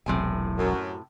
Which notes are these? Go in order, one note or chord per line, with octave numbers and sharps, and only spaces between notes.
E1 B1 A2 C3 F#3 G#5
F#2